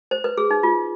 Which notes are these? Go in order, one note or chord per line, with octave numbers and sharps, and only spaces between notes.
C5
B4
G#4
D#4
F4